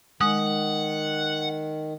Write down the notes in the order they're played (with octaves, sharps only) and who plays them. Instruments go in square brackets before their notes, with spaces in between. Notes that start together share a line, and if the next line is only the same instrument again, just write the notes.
[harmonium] D#3 [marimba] G#3 [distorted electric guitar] F#5 [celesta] D#6